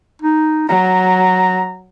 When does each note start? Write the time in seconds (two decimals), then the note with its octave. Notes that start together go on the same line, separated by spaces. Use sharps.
0.22 D#4
0.68 F#3 A#5